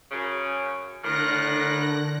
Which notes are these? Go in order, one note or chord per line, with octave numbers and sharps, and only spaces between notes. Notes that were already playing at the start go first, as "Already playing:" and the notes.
F#2 C#3
A2 D3 A#4 F#6 A#6